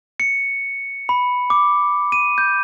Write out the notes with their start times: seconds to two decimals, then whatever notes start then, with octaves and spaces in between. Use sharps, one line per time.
0.20 C#7
1.09 B5
1.50 D6
2.12 D#7
2.38 G6